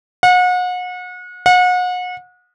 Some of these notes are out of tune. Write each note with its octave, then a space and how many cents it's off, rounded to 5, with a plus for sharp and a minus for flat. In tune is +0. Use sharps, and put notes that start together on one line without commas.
F#5 -35
F#5 -35